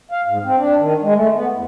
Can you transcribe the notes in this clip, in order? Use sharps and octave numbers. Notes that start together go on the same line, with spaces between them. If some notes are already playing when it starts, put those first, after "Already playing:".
F5
G#2
C4
D4
D#3
G#3
A3
B3
E2